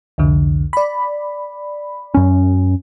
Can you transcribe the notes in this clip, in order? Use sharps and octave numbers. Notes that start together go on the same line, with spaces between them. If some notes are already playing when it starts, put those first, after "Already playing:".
C2 F2 D3
D5 B5
F#2 C#4